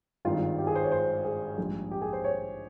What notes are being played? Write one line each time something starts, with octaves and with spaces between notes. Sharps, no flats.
G#1 G2 D#3 G#3 F4
G4
G#4
C5
C#5
C5
G#4
A#1 G#2 G3
G4
G#4
C5
C#5